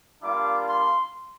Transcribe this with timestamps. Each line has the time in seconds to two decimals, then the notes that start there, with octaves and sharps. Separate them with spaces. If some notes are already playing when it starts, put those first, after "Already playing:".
0.22 G3 A#3 D4 F4 D6
0.66 C6